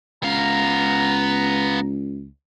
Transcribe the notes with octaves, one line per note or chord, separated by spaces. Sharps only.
C#2 B3 F5 A#5